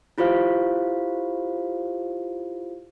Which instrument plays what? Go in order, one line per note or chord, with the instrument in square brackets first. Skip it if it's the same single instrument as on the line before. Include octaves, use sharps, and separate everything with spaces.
[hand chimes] E4 F4 G4 C5 F5